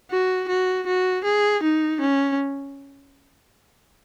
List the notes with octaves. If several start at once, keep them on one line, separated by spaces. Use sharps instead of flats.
F#4
F#4
F#4
G#4
D#4
C#4